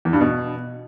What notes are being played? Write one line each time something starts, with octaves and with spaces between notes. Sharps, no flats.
E2
G2
B2